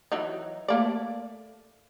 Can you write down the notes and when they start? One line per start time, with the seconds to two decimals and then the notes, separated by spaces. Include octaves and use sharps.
0.12 E3 F#3 D#4
0.68 A3 A#3 D5